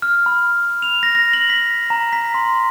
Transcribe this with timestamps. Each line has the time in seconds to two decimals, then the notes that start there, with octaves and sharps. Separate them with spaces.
0.02 F6
0.26 B5
0.82 F7
1.03 A#6
1.15 A#6
1.33 F#7
1.50 B6
1.90 A#5
2.13 B6
2.34 C6